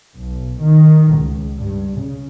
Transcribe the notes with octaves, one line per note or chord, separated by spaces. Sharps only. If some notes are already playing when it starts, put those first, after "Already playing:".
B1
D#3
C#2
G2
C#3